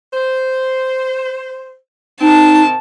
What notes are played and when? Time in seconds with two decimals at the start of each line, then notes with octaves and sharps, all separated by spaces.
0.14 C5
2.21 C3 D#3 C4 D#4 A5